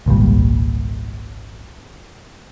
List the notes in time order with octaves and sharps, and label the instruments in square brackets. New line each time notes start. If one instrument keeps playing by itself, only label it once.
[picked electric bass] G#1 C#2 A#2 G3